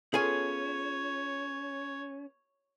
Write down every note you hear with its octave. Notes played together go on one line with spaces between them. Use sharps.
B3 C#4 F4 G#4 A4 C#5 G#5